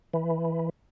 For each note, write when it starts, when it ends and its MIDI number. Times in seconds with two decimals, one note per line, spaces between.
0.14 0.69 52